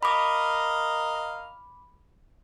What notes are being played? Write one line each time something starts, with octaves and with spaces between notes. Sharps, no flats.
A#4 D#5 F5 B5 D6